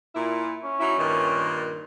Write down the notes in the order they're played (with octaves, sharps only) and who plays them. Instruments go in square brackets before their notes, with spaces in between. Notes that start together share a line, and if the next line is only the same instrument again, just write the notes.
[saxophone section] A#2 E4
[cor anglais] C#4
[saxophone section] F#3 D#4 E4
G2 A#2 D#3